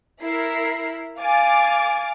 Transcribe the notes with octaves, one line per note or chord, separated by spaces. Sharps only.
E4 A#4 C7
F5 G#5 D6 A6